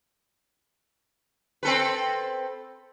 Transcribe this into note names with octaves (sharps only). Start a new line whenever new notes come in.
C4 A4 B4